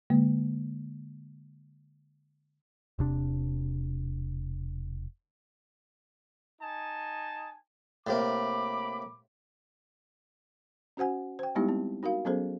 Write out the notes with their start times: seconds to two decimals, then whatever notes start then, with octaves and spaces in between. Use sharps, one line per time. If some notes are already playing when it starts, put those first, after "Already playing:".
0.10 D3 G#3 A#3
2.99 E1 C3 D4
6.62 D#4 G#5 A5
8.07 A2 C3 A#3 B5 D6
10.97 C#4 F#4 C5 F#5 G#5
11.39 C5 G5
11.55 G3 G#3 B3 D#4 E4 G4
11.69 C4
12.03 D#4 F#4 A#4 F5
12.25 F#3 B3 C#4 G#4 A4 C5